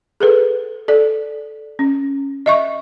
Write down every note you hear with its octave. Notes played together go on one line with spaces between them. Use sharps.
G#4 A4 B4
A4 D5
C#4
D#5 E5 C#6